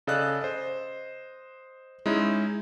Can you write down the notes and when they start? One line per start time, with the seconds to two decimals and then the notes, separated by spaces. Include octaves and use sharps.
0.07 C#3 A4 D5 D#5 F5 F#6
0.42 C5 D#5
2.06 G#3 C#4 D#4 E4